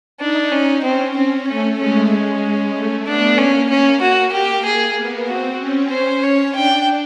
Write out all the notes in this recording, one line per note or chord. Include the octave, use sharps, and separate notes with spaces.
D4 D#4
C#4
C4 C#4
C4
A3 C#4
G#3 C#4
C#4
G#3
A3
B3 D4
A#3 C#4
A#3 C#4
A#3 F#4
G4
G#4
B3
C4 F#4
C#4
C5
C#5
D4 G5